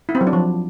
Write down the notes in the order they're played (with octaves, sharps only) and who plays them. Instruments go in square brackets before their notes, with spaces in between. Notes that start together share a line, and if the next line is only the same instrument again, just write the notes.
[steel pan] E4
C4
F#3
D4
F3